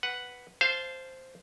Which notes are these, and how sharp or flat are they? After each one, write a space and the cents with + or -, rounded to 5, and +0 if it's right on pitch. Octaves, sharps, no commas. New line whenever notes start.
B4 +0 F#5 +0
C5 +0 F5 -15 A5 -15